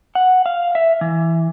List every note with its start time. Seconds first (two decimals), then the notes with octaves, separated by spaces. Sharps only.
0.15 F#5
0.46 F5
0.75 E5
1.01 E3